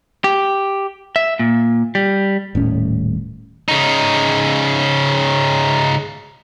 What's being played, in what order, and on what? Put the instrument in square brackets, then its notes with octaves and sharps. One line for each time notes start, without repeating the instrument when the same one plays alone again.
[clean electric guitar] G4
E5
A#2
G3
[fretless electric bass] D#1 A2 C#4
[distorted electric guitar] C#3 D#4